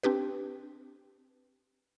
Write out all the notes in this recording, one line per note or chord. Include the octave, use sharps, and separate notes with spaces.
C4 D4 G4 B4